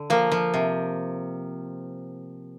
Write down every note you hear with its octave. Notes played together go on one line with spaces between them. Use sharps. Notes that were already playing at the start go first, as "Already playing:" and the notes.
Already playing: D3
F3 A#3
F3
C3